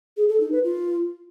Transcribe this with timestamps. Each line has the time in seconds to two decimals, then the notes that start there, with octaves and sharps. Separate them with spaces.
0.17 G#4
0.29 A4
0.40 D#4
0.52 B4
0.64 F4